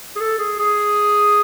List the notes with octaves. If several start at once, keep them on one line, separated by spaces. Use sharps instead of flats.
G#4
A4
G#4
G#4